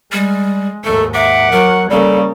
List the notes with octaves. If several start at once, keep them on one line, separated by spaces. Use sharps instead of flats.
G3 G#3
D#2 G#2 A3 A4
E5 F#5 D6
F#3 A#4
C#3 G3 A#3 A4